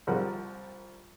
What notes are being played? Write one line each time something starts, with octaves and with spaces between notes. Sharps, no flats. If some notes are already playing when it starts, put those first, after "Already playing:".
C2 F3 G3 A#4 F#5